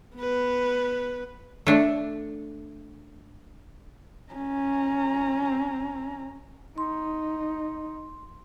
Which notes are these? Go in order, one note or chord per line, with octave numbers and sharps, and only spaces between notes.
B3 B4
A3 D4
C#4 A#5
D#4 C6